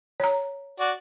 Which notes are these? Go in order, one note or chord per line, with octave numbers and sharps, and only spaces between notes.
C#5 A#5
F#4 D5